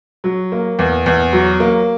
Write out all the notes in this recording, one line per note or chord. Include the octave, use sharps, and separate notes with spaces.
F#3
A#3
E2
E2
F#3
A#3